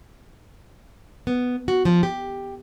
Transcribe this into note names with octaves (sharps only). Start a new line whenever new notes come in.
B3
F#4
F3
G4